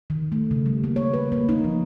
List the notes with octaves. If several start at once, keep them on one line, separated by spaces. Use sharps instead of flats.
D#3
A3
C#3
G3
A#3
C#5
B4
A#3
D#4
F3